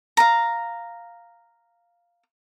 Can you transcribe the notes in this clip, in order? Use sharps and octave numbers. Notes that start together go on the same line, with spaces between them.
F5 A#5